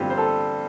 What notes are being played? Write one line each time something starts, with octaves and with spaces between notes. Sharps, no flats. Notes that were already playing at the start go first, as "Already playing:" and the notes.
Already playing: G2 D3 G3 C4 F4 G4
C5
A4